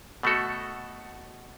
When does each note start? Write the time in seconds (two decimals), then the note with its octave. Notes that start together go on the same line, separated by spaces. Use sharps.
0.23 B2 A3 F#4 A4